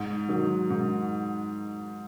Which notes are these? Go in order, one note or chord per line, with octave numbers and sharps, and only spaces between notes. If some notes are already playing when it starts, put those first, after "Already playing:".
Already playing: G#2
D#3 F#3
G#2